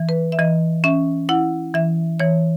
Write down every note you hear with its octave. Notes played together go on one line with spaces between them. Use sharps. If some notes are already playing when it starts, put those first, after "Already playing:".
Already playing: E3
B4
E5
E3 D#5
C#4 E5
E4 F#5
E3 E5
E3 C#5